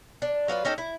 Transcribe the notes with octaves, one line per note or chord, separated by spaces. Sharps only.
D4
F#3 F4 B4 D5
C#4 D#4 G4 A4
E4